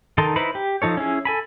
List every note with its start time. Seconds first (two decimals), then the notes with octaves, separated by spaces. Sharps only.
0.18 D#3 D#4 A4 C6
0.36 D#4 E4 B4 C5 B5
0.55 G4
0.82 F3 D#4 A4 C#5
0.97 C#4 E4 G#4
1.25 A4 G#5 B5